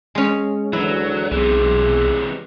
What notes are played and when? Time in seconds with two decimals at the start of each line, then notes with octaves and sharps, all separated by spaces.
0.15 G#3 C#4
0.73 D2 E3 F#3 E4
1.31 B1 C3 E3 G#4